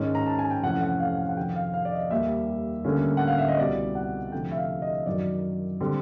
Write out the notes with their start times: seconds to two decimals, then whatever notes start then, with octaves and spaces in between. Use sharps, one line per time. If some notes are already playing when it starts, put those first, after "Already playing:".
Already playing: G#2 D#3 G#3 C#4
0.15 A#5
0.26 A5
0.39 G#5
0.51 G5
0.63 F2 C3 E3 A3 C#4 F#5
0.81 F#5
1.00 F5
1.18 F#5
1.29 F#5
1.36 F2 C3 D#3 G5
1.55 F5
1.74 F5
1.85 D5
1.92 D#5
2.10 D#2 D#3 G3 A#3 E5
2.84 D2 D3 G3 A#3 C#4
3.17 F#5
3.27 F5
3.38 E5
3.48 D#5
3.58 C2 B2 G3 D5
3.95 F#5
4.32 D2 C3 F3 A3 D4 G5
4.51 E5
4.57 F5
4.82 D#5
5.06 F#2 D#3 F#3 D5
5.80 D3 G3 C4